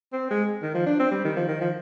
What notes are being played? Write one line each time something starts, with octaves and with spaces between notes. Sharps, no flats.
C4
G#3
D#3
F3
D4
C4
G3
D#3
F3
D#3
F3